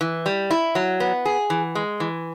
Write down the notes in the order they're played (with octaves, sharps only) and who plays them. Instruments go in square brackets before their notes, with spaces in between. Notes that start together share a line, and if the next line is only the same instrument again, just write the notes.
[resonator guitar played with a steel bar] E3
G3
E4
F#3
B3
G#4
E3
G#3
E3